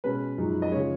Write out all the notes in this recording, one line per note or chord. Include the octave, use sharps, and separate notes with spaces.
B2 G#3 C#4 B4
F#2 F3 G#3 D#4
D#5
C#3 F3 G#3 C#5